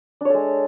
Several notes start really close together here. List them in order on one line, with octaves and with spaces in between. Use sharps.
D4 C#5 A4 G#3